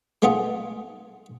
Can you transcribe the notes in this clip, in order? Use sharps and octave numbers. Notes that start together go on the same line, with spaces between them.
G#3 A3 B3 D#4 F4 G#4